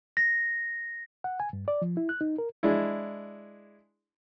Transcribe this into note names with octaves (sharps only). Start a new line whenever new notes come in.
A#6
F#5
G#5
G2
D5
F3
E4
F#6
D#4
A#4
G#3 D4 E4